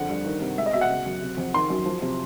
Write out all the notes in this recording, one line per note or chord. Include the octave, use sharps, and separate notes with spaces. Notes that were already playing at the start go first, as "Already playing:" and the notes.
Already playing: F2 D3 F#5
G2
D#3
C3
G#3 E5
D#5
B2 E5
F#5
C#3
F#2
C3
F2
D#3 C6
F#2
F3
C3